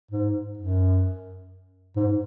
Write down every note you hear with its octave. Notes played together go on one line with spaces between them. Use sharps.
G#2
F#2
G#2